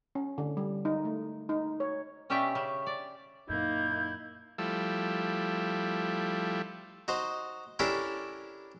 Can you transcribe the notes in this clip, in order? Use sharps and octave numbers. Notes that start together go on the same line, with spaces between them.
C#4
D3
G3
D#4
A3
D#4
C#5
B2 C#4 G4 D5 E5 G5
C#3
D5
F#2 A#2 A#3 D#4 E4 G6
F3 G3 A3 E4
D#4 F#4 C5
C#4 D4 E4 G4 A4 A#4